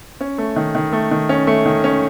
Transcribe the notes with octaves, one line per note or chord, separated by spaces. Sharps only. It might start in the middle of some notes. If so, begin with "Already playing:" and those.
C#4
A3
D#3
D#3
A3
D#3
C#4
A3
D#3
C#4